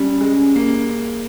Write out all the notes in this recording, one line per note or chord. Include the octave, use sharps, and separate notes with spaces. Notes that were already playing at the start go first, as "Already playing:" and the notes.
Already playing: G3 C#4
G#3
A#3